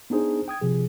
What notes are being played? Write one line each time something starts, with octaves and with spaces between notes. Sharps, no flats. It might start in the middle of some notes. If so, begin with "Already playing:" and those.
B3 D4 D#4 G#4 C5
G5 D#6 G#6
C3 F3 G#4